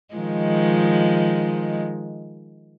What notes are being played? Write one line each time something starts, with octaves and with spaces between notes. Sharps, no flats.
D#3 F3 G#3